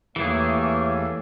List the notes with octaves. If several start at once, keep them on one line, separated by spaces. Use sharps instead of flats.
E2 E3 A3 A#3 G4 G#4 C#5 E5